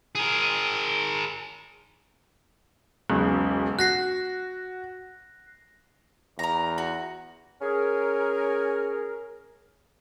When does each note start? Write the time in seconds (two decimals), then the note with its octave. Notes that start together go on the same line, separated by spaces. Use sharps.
0.15 G#4 A#4
3.10 E1 B1 C#3
3.79 F#4 F#6 A#6 C7
6.39 E2 A#4 A#5
6.78 F#4
7.61 C#4 G#4 A#4